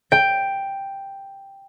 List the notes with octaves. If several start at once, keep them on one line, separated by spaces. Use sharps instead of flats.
G5